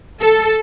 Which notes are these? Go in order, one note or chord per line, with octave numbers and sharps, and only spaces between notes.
A4